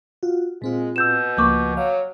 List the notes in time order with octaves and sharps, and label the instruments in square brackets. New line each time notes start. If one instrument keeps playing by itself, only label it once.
[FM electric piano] F4 F#4
[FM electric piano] A#2 C4 F4 [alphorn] G#3
[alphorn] B2 [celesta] E6 G6 E7
[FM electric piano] C#2 F3 A#3 [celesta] C#6 D6 G6
[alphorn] F#3 [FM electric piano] F5